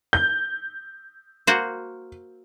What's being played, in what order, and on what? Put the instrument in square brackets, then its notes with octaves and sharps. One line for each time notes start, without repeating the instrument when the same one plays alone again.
[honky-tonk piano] G6
[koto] A#3 F#4 C5